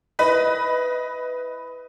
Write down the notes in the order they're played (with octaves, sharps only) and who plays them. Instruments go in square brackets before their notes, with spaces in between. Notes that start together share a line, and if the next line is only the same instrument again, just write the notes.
[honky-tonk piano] E4 B4 D#5 B5